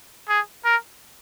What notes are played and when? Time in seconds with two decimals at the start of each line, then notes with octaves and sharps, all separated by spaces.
0.29 G#4
0.65 A#4